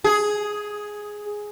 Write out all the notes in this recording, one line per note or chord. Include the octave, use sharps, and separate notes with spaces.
G#4